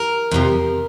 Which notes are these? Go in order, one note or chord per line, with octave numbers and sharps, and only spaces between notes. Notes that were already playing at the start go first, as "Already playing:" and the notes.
Already playing: A#4
F2 C3 F3